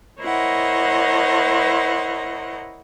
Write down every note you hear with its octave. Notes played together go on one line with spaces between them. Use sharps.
E4 A#4 C5 C#5 D#5 F#5